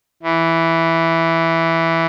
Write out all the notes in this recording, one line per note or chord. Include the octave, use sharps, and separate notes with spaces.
E3